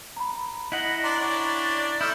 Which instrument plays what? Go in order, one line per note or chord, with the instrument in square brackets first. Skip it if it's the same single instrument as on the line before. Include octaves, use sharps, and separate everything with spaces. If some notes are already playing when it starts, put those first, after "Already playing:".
[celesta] A#5 B5
[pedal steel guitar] E4 F#5 [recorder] D#5
[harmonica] D4 D5 C6 [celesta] A#5
[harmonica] C#4 D4 [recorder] D5
[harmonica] A3 D#5 [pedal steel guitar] E4 [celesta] E6 F6 G6